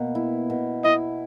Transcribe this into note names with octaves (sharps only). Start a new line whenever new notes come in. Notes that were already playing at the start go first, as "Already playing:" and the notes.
Already playing: B2 A#3
E4
B2
E4 D#5